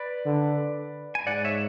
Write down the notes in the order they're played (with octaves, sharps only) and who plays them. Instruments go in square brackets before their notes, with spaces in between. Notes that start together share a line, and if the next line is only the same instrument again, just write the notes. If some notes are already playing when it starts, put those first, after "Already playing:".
Already playing: [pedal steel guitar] B4 D5
[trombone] D3
[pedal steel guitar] G#5
[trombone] G#2 [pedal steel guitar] D5 F#5
[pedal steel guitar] C#5 E5